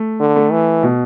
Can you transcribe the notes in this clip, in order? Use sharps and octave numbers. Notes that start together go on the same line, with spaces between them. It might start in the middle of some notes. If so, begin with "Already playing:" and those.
Already playing: A3
D3
A3
E3
B2